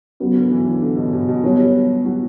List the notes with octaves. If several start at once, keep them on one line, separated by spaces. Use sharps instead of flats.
C#3 F#3 B3 F#4
D3
E3
D3
D3
B2
B2
B2
F#3 G3 B3 F#4 C#5
F#3